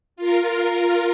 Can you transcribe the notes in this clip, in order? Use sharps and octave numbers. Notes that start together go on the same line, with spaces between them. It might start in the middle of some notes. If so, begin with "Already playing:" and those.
F4 A#4